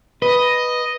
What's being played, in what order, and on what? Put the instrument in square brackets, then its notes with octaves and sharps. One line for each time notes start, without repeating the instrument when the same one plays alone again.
[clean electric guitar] B4 [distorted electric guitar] D#5